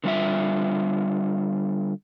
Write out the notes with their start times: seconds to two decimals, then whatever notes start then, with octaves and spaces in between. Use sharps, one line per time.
0.04 D3 G3 F4 E5